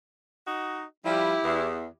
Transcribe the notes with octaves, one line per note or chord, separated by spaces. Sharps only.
D#4 F#4 D#5
F3 G3 E4 G4
E2